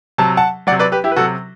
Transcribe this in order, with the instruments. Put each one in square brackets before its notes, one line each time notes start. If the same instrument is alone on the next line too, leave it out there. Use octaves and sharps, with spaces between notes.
[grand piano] C3 F#3 A5
F#5 A5
F#3 D5 F#5
C3
B4 D5
G4 B4
E4 G4
B4
C3 F#3 F#4 A4